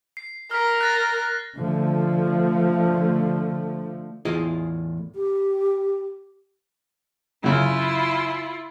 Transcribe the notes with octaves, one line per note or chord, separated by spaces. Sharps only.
C7
A#4 F6 B6
F#6 A6 A#6
D3 F3 A3
E2 A2 E4 F4 G#4 D#5
G4
F#2 C#3 E4 F4